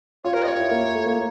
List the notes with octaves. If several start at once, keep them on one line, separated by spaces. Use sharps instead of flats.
F4 C#5
G4 A#4
D#5
F4 C#5
E4
A#3
A3
A#3